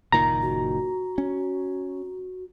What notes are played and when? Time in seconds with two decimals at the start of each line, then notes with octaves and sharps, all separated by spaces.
0.12 F#1 A#2 D#3 A#5
0.42 F#4
1.18 C#4